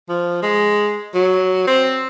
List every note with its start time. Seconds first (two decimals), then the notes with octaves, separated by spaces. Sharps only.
0.09 F3
0.42 G#3
1.14 F#3
1.67 C4